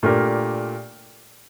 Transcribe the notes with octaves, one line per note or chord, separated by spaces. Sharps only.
A#2 A3 D4 G4 A#4